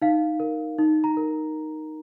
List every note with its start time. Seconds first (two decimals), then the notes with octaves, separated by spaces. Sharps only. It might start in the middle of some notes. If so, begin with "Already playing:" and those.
0.02 D#4 F5
0.40 A#4
0.78 D#4
1.04 A#5
1.17 A#4